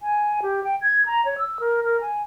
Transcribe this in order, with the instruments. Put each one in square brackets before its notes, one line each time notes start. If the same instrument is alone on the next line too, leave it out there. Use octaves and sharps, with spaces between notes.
[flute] G#5
G4
G5
G#6
A#5
C#5
E6
A#4
A#4
G#5